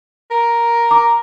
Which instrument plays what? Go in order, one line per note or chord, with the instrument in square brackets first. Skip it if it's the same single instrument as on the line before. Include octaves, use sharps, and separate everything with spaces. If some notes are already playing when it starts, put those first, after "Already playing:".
[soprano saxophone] A#4
[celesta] A#5 D6